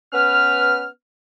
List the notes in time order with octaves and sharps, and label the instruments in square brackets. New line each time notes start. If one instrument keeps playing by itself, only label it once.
[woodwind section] B3 C#4 B4 F6